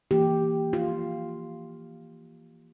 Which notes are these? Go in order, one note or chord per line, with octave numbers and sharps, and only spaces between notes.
E3 A#3 G4
F4